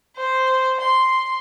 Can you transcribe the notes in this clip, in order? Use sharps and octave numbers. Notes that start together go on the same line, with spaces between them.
C5
C6